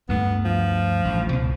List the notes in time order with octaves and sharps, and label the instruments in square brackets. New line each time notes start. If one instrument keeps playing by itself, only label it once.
[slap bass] D2 G2 A3 [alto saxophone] B3
[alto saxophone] F3
[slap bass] A1 D2
C#2 B2